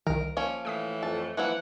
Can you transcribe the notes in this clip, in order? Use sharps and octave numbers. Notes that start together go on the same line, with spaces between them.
C2 D#3 A#4
F3 A#3 C#4
A2 E3 A3 G5 D#6 B6
F2 A5
E3 F3 A#3 E4 F#5